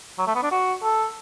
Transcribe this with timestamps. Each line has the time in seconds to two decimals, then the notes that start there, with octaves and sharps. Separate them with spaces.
0.19 F#3
0.27 A3
0.35 B3
0.43 D4
0.51 F#4
0.83 A4